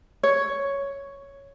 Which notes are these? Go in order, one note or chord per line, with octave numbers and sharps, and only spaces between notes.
C#5